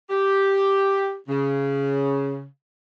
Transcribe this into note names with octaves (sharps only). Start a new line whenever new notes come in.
G4
C#3